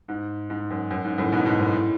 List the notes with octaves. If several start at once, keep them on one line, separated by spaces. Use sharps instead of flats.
G#2
G#2
F#2
F#2
G#2
F#2 A2
G#2 B2
G#2 B2
F#2 A2
A2